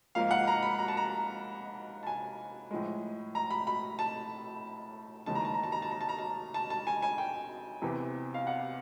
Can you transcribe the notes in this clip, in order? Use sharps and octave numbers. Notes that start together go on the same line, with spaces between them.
G#2 F3 A#3 F5
F#5
A#5
B5
A#5
A5
A#5
A5
G#5
A2 F3 G#3
A#5
B5
B5
A5
D#2 C#3 E3 G#3 A5
A#5
A5
A#5
A5
A#5
A5
A#5
A5
A#5
A5
A5
A5
G#5
G#5
G5
E2 C3 E3
F5
F#5